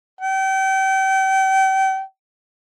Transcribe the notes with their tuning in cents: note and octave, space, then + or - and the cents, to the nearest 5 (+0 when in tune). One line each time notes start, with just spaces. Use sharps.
G5 -35